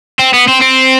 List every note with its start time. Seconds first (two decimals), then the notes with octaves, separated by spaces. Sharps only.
0.19 C4
0.34 B3
0.48 C4
0.62 C4